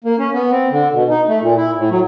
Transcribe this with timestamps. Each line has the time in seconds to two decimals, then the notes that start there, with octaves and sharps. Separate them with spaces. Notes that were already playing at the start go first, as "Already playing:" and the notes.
0.04 A#3
0.19 C#4
0.33 B3
0.51 C4
0.71 D3
0.93 B2
1.10 D#4
1.28 A3
1.42 A#2
1.57 E4
1.76 A2
1.90 F#3